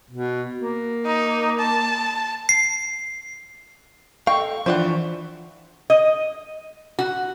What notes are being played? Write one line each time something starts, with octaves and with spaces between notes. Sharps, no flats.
B2
A#3
D#4
A5
C7
A4 D#5 F5 G5 C#6
E3 F3 D4 F4 C5 D5 F#5
D#5
F#4